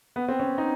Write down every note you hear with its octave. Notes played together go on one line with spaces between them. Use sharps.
B3
C4
C#4
D#4